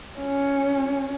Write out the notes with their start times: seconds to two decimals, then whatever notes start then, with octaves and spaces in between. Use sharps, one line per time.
0.19 C#4